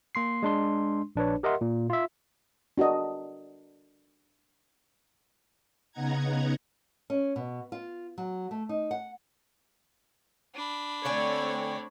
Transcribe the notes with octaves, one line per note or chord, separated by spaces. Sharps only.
A#3 C6 C7
G#3 D4 C6
A#1 D4 B4 C#5
G4 A#4 D#5 E5 F#5 C6
A#2
F4 E5
D4 F#4 A#4 D#5
C#3 B3 D#4 F#5 A#5 G#6
C#4
B2
F4
F#3
A3
D#4
F#5
D4 B5
D3 A3 C4 C#5 G5 G#5